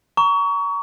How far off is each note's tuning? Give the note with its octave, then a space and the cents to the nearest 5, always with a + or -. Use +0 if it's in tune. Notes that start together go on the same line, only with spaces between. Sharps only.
A#5 +0 C#6 +30